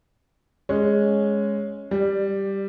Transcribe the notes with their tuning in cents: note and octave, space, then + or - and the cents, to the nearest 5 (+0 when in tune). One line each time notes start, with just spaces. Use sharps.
G#3 +0 C#4 +0
G3 +0 D5 +20